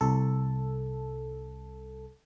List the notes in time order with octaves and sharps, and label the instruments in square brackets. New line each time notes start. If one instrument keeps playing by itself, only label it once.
[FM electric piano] C2 A4